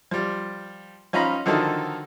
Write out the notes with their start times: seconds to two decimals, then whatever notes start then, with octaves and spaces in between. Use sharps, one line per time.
0.11 F3 G3
1.13 F3 C#4 D#4 F4 A#5 B5
1.46 D3 D#3 F3 F#3 D#4 A4